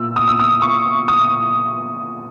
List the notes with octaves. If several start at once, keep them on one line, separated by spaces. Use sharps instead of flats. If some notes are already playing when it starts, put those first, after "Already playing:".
Already playing: A#2 E6
D#6
E6
D#6
C#6
D#6